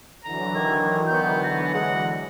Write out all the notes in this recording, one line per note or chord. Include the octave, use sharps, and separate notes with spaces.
D3 E3 F#3 A#5
D#3 G#6
B3 G6
A#6
G#3 F#5